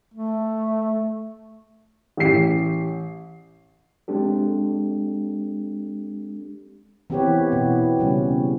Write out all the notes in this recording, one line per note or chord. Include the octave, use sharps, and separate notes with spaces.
A3
A1 G4 C7
G#3 C4 D4 G4 A4
E3 B3 C4 G4 B4 C#5
B2 B3
C#3 G3 C#4